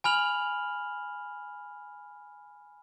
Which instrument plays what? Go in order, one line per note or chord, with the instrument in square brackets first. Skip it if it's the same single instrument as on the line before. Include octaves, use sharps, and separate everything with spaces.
[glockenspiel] G#5 B5 F6 F7 F#7